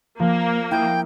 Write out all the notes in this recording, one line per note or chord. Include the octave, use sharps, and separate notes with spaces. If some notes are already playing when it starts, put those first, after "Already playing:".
F3 A#3
E4 G5 D#6